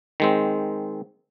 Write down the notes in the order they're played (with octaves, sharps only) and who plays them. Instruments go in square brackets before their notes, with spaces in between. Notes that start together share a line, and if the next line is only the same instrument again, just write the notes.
[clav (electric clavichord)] D#3 G#3 C4